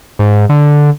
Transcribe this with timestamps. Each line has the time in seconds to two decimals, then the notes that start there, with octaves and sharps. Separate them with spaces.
0.19 G#2
0.49 D3